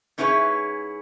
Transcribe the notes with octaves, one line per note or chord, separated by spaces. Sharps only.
G#2 C#4 E4 G#4 B4 C#5